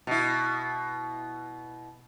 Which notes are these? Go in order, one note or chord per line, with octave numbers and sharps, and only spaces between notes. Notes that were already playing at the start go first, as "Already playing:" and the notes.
B2 E4